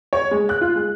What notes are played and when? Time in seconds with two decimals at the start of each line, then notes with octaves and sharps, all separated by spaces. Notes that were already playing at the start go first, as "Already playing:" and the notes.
0.13 C#5
0.31 G#3
0.49 F#6
0.61 F4
0.76 G#3